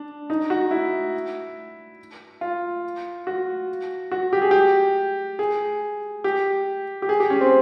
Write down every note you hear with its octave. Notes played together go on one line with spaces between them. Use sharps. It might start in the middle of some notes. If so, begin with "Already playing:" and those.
Already playing: D4
D#4
F#4
E4
F4
F#4
F#4
G4
G#4
G4
G#4
G4
G4
G#4
G4
C#4
C4